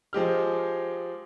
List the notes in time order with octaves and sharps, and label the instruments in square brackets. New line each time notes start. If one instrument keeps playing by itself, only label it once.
[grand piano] F3 G#3 G4 F6